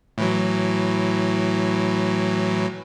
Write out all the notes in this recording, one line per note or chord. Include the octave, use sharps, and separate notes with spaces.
A2 E3 F#3